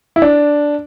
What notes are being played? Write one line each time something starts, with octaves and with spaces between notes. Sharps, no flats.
E4
D4